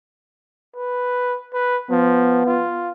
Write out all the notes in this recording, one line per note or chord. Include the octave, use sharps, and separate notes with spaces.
B4
B4
F3 B3
F4